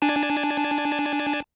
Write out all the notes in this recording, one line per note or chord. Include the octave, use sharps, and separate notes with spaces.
D4 G#5 A5